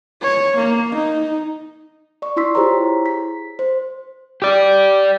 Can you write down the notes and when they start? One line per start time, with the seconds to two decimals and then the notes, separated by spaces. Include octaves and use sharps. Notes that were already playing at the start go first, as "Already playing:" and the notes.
0.22 C#5
0.56 A#3
0.95 D#4
2.22 D5 C#6
2.36 E4 F4 C6 E6 B6
2.55 E4 G4 G#4 C5 C#5 A#5
3.06 B6
3.59 C5
4.42 G4 D5